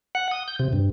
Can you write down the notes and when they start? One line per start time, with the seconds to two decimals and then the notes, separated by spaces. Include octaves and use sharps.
0.15 F#5
0.31 D#6
0.48 G6
0.59 C3
0.73 G2